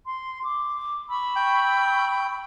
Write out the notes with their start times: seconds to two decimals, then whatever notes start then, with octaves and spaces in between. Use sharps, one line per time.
0.05 C6
0.43 D6
1.09 B5 C#6 E6
1.36 G5